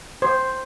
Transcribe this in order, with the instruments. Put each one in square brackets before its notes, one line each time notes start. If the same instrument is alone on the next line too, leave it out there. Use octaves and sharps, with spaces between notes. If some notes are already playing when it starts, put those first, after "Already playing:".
[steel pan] C5